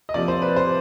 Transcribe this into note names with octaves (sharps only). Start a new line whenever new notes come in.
D#5
C3 F3 A#3 D5
C5
B4
C5